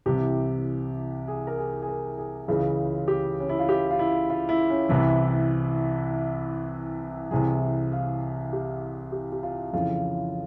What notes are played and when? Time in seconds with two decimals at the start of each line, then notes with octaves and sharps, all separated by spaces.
0.06 C2 C3 E3 G4
1.28 G#4
1.47 A#4
1.58 G#4
1.82 G#4
1.88 A#4
2.18 G#4
2.48 C#2 C#3 E3 F4
3.08 G4
3.40 C#4
3.49 E4
3.59 F4
3.69 G4
3.91 F4
3.99 E4
4.30 F4
4.49 E4
4.70 C#4
4.89 C2 C3 E3 E4
7.31 C2 C3 E3 G#4
7.92 F5
8.53 G4
9.12 G4
9.32 G4
9.43 F4
9.73 F2 C#3 E3 F4